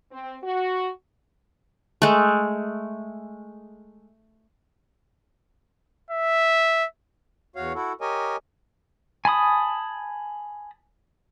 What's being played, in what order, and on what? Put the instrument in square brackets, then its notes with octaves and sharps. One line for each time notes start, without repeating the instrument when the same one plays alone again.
[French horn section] C4
F#4
[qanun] G#3 A3
[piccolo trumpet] E5
[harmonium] E2 F#4 C#5 F5
E4 F#4 A4
G4 A#4 C#5 D#5 G#5
[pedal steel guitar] G#5 A5 B5 D#6